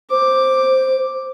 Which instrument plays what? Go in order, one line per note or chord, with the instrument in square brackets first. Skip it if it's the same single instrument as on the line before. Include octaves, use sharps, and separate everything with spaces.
[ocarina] C5 [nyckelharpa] D6